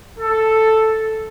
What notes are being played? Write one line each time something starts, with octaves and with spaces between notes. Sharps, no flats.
A4